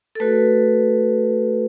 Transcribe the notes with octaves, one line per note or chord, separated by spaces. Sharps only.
A4
A3 F#4 B4